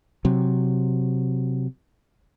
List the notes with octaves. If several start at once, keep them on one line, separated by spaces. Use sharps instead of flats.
C3 F#3